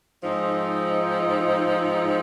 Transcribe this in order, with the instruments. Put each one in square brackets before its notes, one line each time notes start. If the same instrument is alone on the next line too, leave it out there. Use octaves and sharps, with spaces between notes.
[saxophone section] G#2 F3 C4 D#4